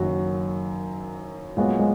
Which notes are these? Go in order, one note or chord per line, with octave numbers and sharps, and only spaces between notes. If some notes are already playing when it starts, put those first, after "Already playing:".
Already playing: F#1 F#2 D#3 F#3 F#4
A#2 F#3 G#3 B3 F#4
G#3